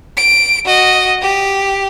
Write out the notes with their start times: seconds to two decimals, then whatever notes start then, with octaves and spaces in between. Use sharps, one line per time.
0.17 D7
0.65 F#4 D#5
1.22 G4